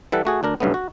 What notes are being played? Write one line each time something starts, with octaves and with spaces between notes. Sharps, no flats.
E3 G3 A4 F#5
A3 F#4 G#4
D2 D4 A#4
B1 G2 C#3 A3 B3
F#4